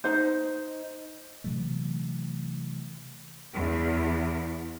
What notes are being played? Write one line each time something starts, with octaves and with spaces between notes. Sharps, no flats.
D#4 C5
C3 E3 F#3 A3
E2